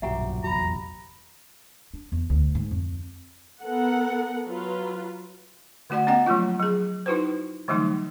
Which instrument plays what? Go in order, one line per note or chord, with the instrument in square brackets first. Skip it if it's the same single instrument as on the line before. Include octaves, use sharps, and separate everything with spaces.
[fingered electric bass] B1 G2 [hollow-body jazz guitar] A#2 F#3 G4 [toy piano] E5 F#5 A#5
[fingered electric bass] F1 A#1 E2 [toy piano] F#4 B5 [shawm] A#5
[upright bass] D4
E2
D2
G#2
F2
[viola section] B3 A4 A#4 F#5
F#3 F4 B4
[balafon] D3 A3 F#4 D5 F#5
B3 C#4 D#5 F#5 G5
F3 F#3 A3 A#3 F4
F#3 G#4
D#4 E4 F#4 B4 C5
D3 E3 F#3 G3 A3 D#4